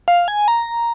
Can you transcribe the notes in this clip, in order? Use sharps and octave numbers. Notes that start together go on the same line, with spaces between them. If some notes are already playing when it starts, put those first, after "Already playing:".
F5
G#5
A#5